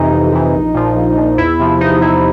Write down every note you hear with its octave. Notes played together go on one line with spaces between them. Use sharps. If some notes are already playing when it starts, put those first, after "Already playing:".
Already playing: F2 C3 E3 D#4
F2
C3 E3
A#1
A#2 F3
A#1
A#2 F3
E2 E4
C3 F3
E2 D#4
C3 F3 E4